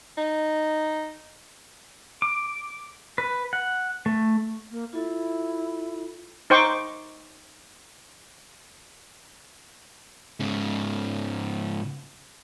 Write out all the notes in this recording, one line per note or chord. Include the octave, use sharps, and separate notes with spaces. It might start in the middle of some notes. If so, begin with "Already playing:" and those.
D#4
D6
B4
F#5
A3
A#3
E4 F4 A4
D#4 C5 G5 C#6 D6
G#2 C#3